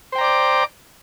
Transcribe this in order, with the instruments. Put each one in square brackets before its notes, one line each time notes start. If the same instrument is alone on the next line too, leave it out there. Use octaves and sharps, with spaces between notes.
[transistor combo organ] C5
G5
A#5
D5
D6